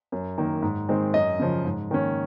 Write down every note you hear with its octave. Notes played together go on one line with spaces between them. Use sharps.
F#2
D#3 A#3
G#2
D#3 G#3 C4
F#2 D#5
C#3 F3
G#2
D#3 A#3 C#4